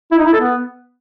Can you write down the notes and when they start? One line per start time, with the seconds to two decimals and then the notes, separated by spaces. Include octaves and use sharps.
0.11 E4
0.19 D#4
0.26 E4
0.33 A4
0.40 B3